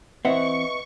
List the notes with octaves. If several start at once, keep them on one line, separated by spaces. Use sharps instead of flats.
E3 C4 B4 D#5 E5 F#5 C#6